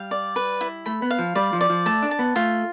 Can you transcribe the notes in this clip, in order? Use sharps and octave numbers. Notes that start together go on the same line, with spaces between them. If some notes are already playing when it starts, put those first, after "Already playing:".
Already playing: G3 F5
D5
B4
E4
A3 B5
B3
F5
F3
G3 D5
F3
D5
F3
A3 A5
D4
A5
B3
A3 F4